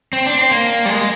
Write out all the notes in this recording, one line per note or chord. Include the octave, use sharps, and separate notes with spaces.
C4
D4
C4
A#3
G3
G#3